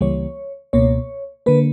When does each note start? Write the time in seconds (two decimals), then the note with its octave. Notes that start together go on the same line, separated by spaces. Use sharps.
0.01 C#2 C#3 E3 G3 A#3 C#5
0.73 C#2 B2 A#3 C#5
1.46 D3 A#3 B4